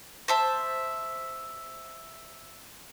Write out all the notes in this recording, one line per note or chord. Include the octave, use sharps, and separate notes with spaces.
C5 E5 A5